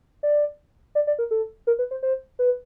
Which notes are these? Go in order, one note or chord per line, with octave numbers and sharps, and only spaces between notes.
D5
D5
D5
A#4
A4
A#4
B4
C5
C5
B4